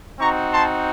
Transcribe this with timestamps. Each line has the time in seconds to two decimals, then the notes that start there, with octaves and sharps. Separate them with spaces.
0.19 C4 D#4 F#4 A#5 C#6
0.53 A5 C6